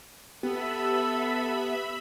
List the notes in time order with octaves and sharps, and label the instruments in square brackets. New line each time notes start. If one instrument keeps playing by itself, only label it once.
[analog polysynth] B3 [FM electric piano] G4 [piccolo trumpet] A4 [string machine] E5 B5